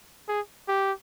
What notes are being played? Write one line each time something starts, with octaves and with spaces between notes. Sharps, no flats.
G#4
G4